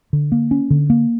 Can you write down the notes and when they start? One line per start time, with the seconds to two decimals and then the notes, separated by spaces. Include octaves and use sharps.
0.13 D3
0.32 A#3
0.51 C#4
0.70 D3
0.90 A#3